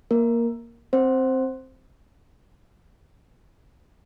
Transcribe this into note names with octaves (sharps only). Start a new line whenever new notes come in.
A#3 A#4
C4 C5